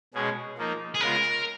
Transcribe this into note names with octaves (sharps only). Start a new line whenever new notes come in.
B2 G#3 C#4 G#4
F3 A#3 D#4
G#4
C#3 G#3 B3 F4 A#4